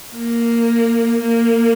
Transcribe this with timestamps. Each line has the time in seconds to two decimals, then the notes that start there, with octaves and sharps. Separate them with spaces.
0.14 A#3
1.20 A#3